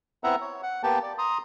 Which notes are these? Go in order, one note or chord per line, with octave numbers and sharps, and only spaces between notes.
B3 C4 E4 E5 F#5 A#5
C#5
F#5
A#3 B3 G4 G5 A5
D5
A#5 C6 D#6